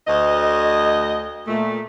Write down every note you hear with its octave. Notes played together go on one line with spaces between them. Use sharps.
D2 D#5
A#2 A3